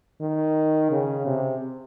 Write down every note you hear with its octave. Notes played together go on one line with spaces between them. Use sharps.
D#3
C#3
C3